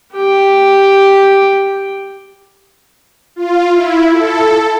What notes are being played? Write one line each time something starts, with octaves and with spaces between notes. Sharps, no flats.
G4 G5
F4
E4
A4